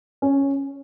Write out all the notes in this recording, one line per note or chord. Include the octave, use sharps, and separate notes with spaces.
C#4